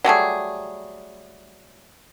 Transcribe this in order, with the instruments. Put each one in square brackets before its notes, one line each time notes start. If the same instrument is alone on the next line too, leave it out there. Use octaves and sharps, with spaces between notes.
[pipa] F#3 G3 A3 G#4